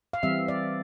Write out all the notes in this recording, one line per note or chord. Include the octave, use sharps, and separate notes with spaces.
F5
E3 G3 C4 E5
D5